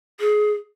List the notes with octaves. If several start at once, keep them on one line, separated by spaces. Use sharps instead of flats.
G#4